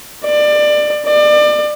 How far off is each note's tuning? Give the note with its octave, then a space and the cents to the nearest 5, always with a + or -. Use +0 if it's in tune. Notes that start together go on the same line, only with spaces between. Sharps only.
D5 +25
D5 +30